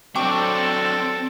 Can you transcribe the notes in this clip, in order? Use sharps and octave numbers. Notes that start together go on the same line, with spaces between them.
F#3 C4 D4 A4 G5 C#6 D6